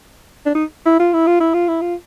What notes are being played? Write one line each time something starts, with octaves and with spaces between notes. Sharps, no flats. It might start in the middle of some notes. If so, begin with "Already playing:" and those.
D4
D#4
E4
F4
E4
F4
E4
F4
E4
F4